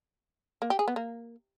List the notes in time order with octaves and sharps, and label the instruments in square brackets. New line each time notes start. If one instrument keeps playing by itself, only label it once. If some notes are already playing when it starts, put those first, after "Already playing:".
[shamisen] A#3
G4
G#4
B3
A#3